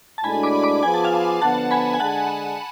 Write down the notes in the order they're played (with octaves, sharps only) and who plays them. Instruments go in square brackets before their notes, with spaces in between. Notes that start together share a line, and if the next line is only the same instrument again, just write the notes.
[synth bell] A5
[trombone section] A2 G#3 D4 F#4 A4 [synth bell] G#5 B5
[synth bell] B5 D6
B5 D6
[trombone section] F3 B3 F4 G#4 [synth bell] G#5
[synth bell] A5
F5 G#5
[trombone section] D3 F3 B3 [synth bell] F#5 A5
[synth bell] G#5 B5
G#5
[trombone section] D3 G#3 D4 G#4 [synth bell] F#5 A5